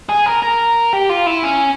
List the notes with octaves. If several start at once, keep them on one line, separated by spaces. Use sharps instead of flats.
G#4
A#4
A#4
G4
F4
E4
C#4